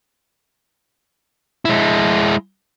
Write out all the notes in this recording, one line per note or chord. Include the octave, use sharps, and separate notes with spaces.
G#3 E4